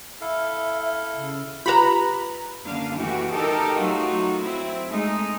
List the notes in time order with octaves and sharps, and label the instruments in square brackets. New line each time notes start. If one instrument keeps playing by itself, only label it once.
[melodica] E4 A4 F5 [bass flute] E5
[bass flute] C#3
[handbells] F4 G4 B4 [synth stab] A#5 B5
[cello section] F#2 D3 A#3 F5
E3 A3 F#4 G4
D#4 G4 A4 A#4
F#3 A3 D#4 F4 F#4
C4 E4
G#3 A3 D#4